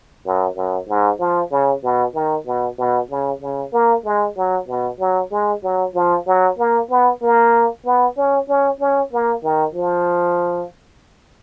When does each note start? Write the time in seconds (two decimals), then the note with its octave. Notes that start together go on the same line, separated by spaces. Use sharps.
0.25 F#2
0.56 F#2
0.88 G#2
1.20 F3
1.52 C#3
1.83 B2
2.14 D#3
2.46 B2
2.78 B2
3.10 C#3
3.42 C#3
3.73 A#3
4.05 G#3
4.37 F#3
4.68 B2
5.00 F#3
5.31 G#3
5.63 F#3
5.94 F3
6.27 F#3
6.58 A#3
6.90 B3
7.22 A#3
7.85 B3
8.17 C#4
8.48 C#4
8.80 C#4
9.12 A#3
9.43 D#3
9.75 F3